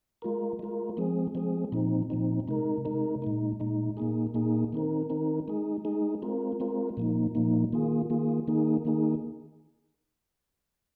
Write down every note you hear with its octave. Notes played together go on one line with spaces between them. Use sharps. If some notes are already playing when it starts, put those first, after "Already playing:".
G#3 F4 A#4
G#3 F4 A#4
F3 G#3 C4 G#4
F3 G#3 C4 G#4
A#2 F3 C4 D#4
A#2 F3 C4 D#4
C3 G#3 D#4 A#4
C3 G#3 D#4 A#4
A#2 G#3 D#4
A#2 G#3 D#4
A#2 A#3 D#4 G#4
A#2 A#3 D#4 G#4
D#3 C4 D#4 A#4
D#3 C4 D#4 A#4
G#3 D#4 G#4
G#3 D#4 G#4
G#3 C4 F4 A#4
G#3 C4 F4 A#4
A#2 F3 A#3 D#4
A#2 F3 A#3 D#4
D#3 A#3 F4 G#4
D#3 A#3 F4 G#4
D#3 A#3 D#4 G#4
D#3 A#3 D#4 G#4